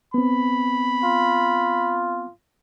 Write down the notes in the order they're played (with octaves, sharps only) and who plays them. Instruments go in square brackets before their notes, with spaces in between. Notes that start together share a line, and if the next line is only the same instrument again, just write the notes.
[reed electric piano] B3 C4 [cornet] B5
[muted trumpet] F4